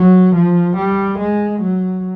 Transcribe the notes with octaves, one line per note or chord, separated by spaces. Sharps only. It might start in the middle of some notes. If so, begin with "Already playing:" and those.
Already playing: F#3
F3
G3
G#3
F#3